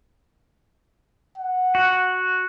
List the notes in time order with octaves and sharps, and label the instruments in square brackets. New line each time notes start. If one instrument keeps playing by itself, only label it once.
[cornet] F#5
[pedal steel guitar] F#4